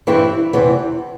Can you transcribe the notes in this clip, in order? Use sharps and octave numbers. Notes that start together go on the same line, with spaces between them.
G2 E3 G3 C4 E4
E2 C3 E3